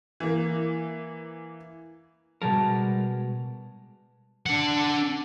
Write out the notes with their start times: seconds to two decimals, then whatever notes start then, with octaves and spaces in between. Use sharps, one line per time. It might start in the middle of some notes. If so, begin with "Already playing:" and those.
0.20 E3 A#3
2.42 B2 G3 G#3 A#4 A5
4.46 D4 F#5